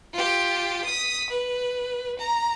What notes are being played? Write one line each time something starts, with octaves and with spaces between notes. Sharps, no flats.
F4 G4
D#6 B6
B4
A#5